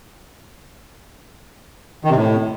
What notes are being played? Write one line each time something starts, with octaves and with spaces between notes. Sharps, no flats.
D#3
C3
A2